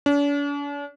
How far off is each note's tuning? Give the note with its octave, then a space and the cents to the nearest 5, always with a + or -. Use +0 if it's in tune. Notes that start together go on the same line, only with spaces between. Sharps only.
D4 -45